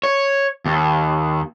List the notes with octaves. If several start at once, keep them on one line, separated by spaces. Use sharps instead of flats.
C#5
D#2